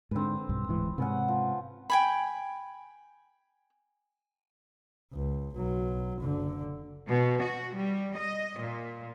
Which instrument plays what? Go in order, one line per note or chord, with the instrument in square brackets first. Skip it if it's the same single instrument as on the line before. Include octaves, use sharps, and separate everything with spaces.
[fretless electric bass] G#2 D3 [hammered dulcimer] C4 B4
[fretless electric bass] B1 G2
D1 G#2 E3
[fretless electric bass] G#2 C3 [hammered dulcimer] B3 C#4 F#5
[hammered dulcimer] F3
[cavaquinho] G5 G#5 B5
[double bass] C#2
B1 F#3
F#1 D3
[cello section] B2
F#4
G3
D#5
A#2